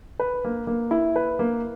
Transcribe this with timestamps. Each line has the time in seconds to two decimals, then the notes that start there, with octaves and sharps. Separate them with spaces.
0.20 B4
0.45 A#3
0.67 A#3
0.91 E4
1.16 B4
1.39 A#3